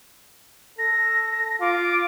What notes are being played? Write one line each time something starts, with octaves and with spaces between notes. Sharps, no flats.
A4 A#6
F4 D6